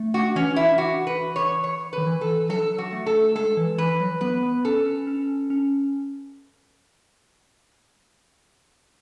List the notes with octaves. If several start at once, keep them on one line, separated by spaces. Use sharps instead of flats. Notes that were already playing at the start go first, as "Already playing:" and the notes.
Already playing: A3
F#4
E3 C#4
E4
F#4
B4
C#5
C#5
B4
D#3
E3
A4
F#3 A4
F#4
A3
A4
G#3 A4
E3
E3 B4
F#3
B3 B4
B3
C#4 A4
C#4
C#4
C#4